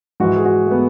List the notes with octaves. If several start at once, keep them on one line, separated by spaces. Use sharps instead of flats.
G#2 E3 F#4
G#4
F#4
A3
B3